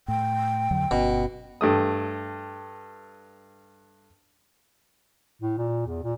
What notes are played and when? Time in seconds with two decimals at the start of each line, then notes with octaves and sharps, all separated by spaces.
0.08 A2 G5
0.71 F2 D3 F#3
0.91 G1 B2 C#4
1.61 G2 A3 D#6
5.42 A2
5.57 A#2
5.86 E2
6.03 A#2